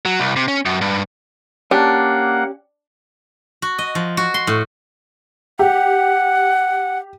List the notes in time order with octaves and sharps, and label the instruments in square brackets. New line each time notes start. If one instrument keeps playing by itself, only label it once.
[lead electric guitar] F#3
C2
C3
C#4
F#2
G2
[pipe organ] A#3 F#5 [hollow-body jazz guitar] C#4 G4 [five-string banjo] D4
[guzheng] F#4
D#5
F3
F#4
C6
A2
[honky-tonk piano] G4 [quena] F#5